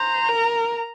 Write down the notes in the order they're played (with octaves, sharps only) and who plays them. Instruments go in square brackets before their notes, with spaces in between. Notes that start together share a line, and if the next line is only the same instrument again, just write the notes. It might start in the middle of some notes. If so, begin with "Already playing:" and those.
Already playing: [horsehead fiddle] C5 [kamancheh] A#5
[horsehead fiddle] A#4